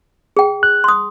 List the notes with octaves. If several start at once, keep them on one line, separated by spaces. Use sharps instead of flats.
G#4 G5
F#6
C6 D#6